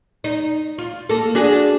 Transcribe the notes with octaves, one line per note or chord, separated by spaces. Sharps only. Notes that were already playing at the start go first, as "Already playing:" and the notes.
D#4
F4
A#3 A4
D4 F#4 G#4